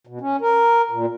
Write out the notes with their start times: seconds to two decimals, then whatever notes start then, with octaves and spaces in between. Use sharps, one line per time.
0.07 B2
0.21 C#4
0.41 A#4
0.91 A#2